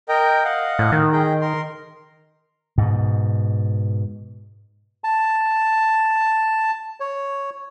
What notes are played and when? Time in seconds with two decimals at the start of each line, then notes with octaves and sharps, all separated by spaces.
0.09 A#4 D#5 G5
0.45 D#5 F5 F#5
0.79 A2
0.92 D#3
1.13 G#4 D#5 G5
1.41 A#4 C6
2.78 G#2 B2
5.04 A5
7.00 C#5